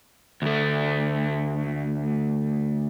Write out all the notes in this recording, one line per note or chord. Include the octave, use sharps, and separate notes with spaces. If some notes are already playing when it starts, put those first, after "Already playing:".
D2 A3